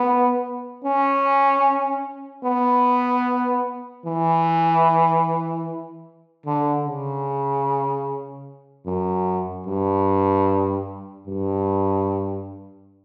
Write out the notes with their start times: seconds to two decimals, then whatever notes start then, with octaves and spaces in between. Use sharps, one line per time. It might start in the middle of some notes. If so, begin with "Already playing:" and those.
Already playing: B3
0.84 C#4
2.45 B3
4.06 E3
6.46 D3
6.86 C#3
8.86 F#2
9.66 G2
11.27 G2